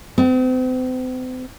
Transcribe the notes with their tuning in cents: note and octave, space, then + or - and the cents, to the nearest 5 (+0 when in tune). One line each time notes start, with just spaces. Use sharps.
C4 -40